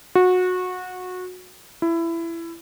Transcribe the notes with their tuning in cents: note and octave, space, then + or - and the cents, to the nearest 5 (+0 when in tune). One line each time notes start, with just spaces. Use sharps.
F#4 -20
E4 +20